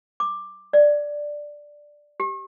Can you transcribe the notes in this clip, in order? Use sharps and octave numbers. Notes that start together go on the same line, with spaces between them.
D6
D5
G4